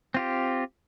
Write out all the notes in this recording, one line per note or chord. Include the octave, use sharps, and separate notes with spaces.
C4 F4 G4